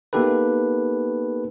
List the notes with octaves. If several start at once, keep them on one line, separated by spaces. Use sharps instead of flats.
A#3 B3 D#4 G4 A4 B4